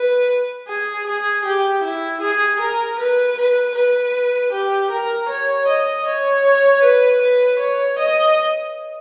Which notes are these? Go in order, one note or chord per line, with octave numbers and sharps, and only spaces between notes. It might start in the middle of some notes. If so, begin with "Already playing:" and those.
Already playing: B4
G#4
G#4
G4
E4
G#4
A#4
B4
B4
B4
G4
A#4
C#5
D#5
C#5
B4
B4
C#5
D#5